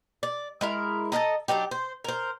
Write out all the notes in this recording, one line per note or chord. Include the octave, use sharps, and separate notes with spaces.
D5
G#3 E4 A#4
A4 B4 D#5 A#5
F#3 D4 D#4 G4
C5
A#4 C5